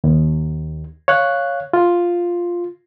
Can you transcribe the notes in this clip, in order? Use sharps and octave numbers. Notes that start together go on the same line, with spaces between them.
D#2
C#5 F5 F#6
F4